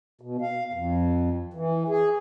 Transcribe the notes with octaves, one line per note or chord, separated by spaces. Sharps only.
B2
F5
F2
E3
G#4